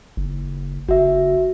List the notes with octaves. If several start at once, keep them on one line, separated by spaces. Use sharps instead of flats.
F#1
F#1 F#4 E5